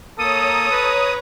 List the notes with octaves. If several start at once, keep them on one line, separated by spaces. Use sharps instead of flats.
A#3 A4 C#5 A#5 D#6
B4